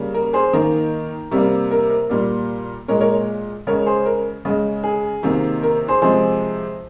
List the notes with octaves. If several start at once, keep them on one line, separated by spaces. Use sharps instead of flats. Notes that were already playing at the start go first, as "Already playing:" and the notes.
Already playing: C#3 G3 A#3
A#4
G#4 C5
D#3 A#3 A#4
C3 G3 A#3
A#4
A#4
A#2 G3 A#3
A#2 G#3 A#4 C#5
A#4 C#5
C#3 G#3 A#4 C#5
G#4 C5
A#4
C#3 G#3
G#4
C3 D#3 A#3
A#4
G#4 C5
C3 F3 G#3 G#4 C5